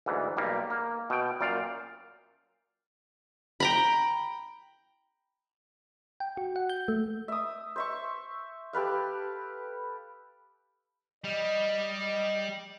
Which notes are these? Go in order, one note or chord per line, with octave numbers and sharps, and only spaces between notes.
D2 G#2 E3
B1 G3 A#3
A#3
B2 G5
F#2 A#2 D5 F5 G5
G5 A#5 B5
G5
F#4
F#5
G6
A3
E5 D#6
C5 E5 C#6
G4 A4 B4 F5
G3 D#5